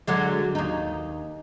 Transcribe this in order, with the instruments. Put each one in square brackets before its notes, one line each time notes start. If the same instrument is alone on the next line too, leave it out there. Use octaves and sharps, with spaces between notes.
[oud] D3 F#3 G#3
D#2 D#4